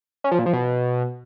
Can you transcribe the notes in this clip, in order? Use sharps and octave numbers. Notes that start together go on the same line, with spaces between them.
C#4
F3
A#2
F3
B2